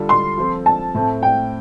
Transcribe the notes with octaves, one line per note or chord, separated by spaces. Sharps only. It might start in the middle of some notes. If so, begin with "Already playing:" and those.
Already playing: D3 G3 F4 A4
C6
F3 C4 F4 A4
A5
A2 A3 C4
G5